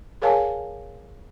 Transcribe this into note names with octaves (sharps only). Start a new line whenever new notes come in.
G#4 A#4 C#5 F5 G#5 A5